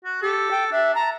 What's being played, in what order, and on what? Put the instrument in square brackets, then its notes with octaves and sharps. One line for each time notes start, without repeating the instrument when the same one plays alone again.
[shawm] F#4
[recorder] G4 [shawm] A4
[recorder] G5
[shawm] D4 [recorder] E5
[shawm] A5 [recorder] A#5